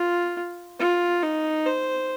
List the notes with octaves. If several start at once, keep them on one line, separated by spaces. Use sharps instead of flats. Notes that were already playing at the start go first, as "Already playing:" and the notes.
Already playing: F4
F4
D#4
C5